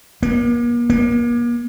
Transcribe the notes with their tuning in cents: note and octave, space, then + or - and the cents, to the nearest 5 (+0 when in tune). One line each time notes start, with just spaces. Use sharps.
A#3 +40
A#3 +40